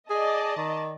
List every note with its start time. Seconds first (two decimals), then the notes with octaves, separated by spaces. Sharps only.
0.10 G#4 D5 D#5 A5
0.57 D#3